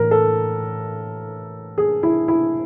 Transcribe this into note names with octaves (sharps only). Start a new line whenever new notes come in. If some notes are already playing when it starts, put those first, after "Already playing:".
Already playing: A2 E3 A#4
A4
G#4
E4
E4